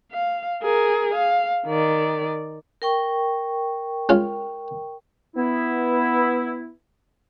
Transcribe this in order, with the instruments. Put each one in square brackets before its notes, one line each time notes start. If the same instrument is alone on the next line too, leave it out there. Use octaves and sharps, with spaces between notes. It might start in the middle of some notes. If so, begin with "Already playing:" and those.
[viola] F5
G#4 A#4
F5
D#3 D5
[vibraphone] A#4 G5 C#6
[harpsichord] G#3 C#4 F4
[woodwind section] B3 E4